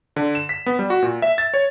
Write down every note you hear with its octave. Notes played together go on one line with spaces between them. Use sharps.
D3
E7
B6
B3
G3
F#4
A#2
E5
A6
C#5